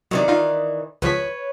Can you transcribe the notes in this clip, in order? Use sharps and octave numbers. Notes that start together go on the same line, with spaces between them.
C3 D#3 E3 F#3 D5
D#4 F4 F5
C#2 F3 B4 C#5 B6